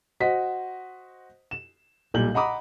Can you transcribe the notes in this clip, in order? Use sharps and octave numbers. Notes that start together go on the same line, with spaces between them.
F#4 C5 D#5 B6
E7
B1 A#2 G3 G6 F#7
D#5 F#5 A#5 B5 D6 D#6